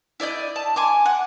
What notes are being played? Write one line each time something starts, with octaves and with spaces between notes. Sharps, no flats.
E4 D5 D#5 G6
A5
G#5 C6 D6
F#5